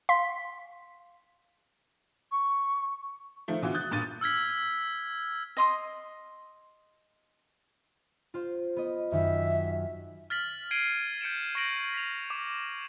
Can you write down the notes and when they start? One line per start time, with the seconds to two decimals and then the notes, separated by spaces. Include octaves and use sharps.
0.09 F5 C6 B6
2.32 C#6
3.48 D#3 F3 A3
3.62 B2 D3 E3 F4 F#4
3.74 D#6 F#6 G6 A6
3.91 G2 A#2 F#6 A6 D#7
4.21 E6 F6 G#6 B6
5.57 D#5 C6 D#6
8.34 F4 C5
8.76 B3 D#5
9.12 F#2 D#3 E5
10.30 F6 A6 B6 F#7
10.71 G#6 C7 D7 D#7 G7
11.21 G6 C#7 D7 E7
11.55 C#6 G6 A#6 D7 F#7
11.94 B6 F7
12.30 D6